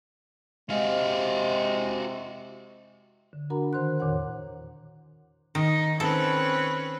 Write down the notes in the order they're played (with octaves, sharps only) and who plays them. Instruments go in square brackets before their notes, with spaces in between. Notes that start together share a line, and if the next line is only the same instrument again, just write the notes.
[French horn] C3 [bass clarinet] G#3 [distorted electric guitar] F#4 F5
[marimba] D3
D4 F#4 A#4 F#5 A#5 B5
D#3 C5 A#5 C6 F#6
E2 A#2 D#3 C#5 F#5
[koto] D#3 [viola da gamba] D#4
[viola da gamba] C4 C#4 B4 [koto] A4